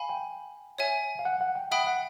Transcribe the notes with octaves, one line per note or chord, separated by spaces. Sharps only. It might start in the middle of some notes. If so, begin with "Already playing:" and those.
Already playing: F5 G#5 B5
G5
C#5 E5 G#5
F5
F#5
F#5
G5
E5 F#5 G5 B5 D#6
F#5